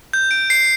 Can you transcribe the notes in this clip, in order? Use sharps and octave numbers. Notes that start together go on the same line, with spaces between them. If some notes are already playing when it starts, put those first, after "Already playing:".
G6
D7
C7